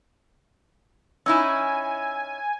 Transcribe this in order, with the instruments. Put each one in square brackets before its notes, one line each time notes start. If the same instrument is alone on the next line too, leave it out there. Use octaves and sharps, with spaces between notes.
[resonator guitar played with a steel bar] C#4 D#4 E4 [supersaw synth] G#5 [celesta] E6